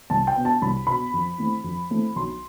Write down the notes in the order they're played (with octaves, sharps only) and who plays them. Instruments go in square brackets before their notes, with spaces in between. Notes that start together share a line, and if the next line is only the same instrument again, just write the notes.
[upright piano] C2 A5
G5
B2 B3
A5
C2 B5
B2 B3 B5
F2
E3 A3 C4
F2
E3 A3 C4
B1 C6